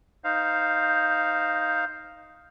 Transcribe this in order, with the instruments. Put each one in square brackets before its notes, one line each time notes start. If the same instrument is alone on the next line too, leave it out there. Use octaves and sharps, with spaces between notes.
[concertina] D#4 C5 F5